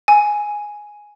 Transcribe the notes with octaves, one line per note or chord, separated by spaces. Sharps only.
G#5